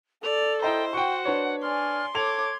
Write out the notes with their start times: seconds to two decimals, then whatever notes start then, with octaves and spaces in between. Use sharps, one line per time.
0.23 A4 D5 F7
0.62 E4 C5 D#5 G5 A#5
0.93 F#4 F#5 G5 C#6
1.25 D4 B4 C#5
1.62 D5 G#5 C6 F6
2.15 A4 C#5 D6 G#6 F7